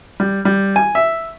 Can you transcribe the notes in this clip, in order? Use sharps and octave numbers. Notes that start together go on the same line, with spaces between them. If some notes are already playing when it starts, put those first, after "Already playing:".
G3
G3
G#5
E5